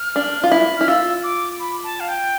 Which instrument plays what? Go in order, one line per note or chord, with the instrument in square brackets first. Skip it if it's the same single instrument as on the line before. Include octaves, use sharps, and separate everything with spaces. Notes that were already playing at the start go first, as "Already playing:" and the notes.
Already playing: [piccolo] F6
[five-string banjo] D4
F4
E4
[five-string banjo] E4 [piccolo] F6
[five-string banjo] F4 [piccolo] E6
[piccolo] D6
B5
A5
F5
G5